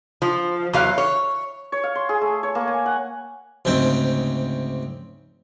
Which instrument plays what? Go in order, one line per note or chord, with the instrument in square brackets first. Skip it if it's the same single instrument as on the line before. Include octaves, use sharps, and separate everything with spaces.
[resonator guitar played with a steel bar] F3
E2 F#3 F5
C#5
[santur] C#5
F5
C6
G#4
A3
C#5
A#3
G#5
F#5
[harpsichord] D2 G#2 C#3 C4 G5